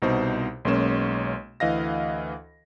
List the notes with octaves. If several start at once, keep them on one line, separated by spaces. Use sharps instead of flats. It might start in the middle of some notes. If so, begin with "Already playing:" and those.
C2 B2 D#4 C5
B1 G#3 A#3 C#4 E7
D2 E3 D#5 F5 A#6